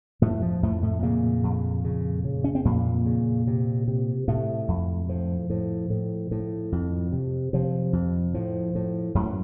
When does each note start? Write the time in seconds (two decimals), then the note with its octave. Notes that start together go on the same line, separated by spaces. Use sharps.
0.22 F2 A2 A3
0.42 F3
0.63 F2 A2 A3
0.82 A2 A3
1.02 A#2 C#3 A#3
1.44 F2
1.84 C#3
2.24 C#3
2.44 C#4
2.55 C4
2.65 F2 A#2 A#3
3.06 C#3
3.47 C3
3.88 C3
4.28 A2 C3 A3
4.68 F2
5.09 A2 F3
5.50 A2
5.90 A2
6.31 A2
6.72 F2
7.12 C3
7.53 C3 F3
7.93 F2
8.34 A2 F3
8.75 A2
9.15 F#2 A2 F#3